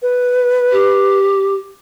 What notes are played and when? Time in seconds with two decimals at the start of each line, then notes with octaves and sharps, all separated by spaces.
0.02 B4
0.72 G4